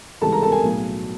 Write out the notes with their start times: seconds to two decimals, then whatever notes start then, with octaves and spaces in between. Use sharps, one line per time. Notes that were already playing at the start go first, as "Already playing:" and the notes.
0.22 C#2 C3 E3 G3 A4 A5
0.32 A#4 A#5
0.42 A4 A5
0.52 G#4 G#5
0.63 B1 A2 F#3